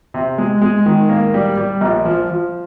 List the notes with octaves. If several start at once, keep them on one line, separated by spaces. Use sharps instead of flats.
C3
G#3
G#3
D#3
A#3
G3
G3
A#1
F3
F3